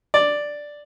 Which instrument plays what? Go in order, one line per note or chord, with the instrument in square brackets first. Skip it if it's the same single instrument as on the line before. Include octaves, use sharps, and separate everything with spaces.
[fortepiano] D5